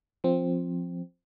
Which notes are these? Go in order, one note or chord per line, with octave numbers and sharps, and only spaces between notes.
F3 C4